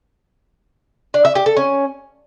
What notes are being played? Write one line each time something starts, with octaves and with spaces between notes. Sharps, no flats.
D4
E5
G4
A4
C#4